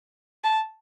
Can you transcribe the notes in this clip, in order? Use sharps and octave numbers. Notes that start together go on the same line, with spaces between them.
A5